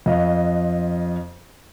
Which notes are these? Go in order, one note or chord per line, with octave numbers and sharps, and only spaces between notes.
F2 D#5 F5